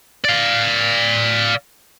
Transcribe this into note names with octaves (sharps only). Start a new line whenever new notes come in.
D5 F5